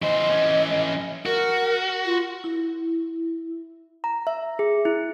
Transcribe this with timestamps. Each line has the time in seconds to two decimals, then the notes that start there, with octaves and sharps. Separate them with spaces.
0.02 E3 C5 D#5
0.30 E3 C#4
1.26 F#4 A#4
2.06 F4
2.44 E4
4.04 A#5
4.27 E5
4.59 G#4
4.85 E4